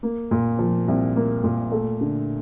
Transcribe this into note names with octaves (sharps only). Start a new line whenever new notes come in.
A#3
A#2
F3
C2
A#3
A#2
A3
D3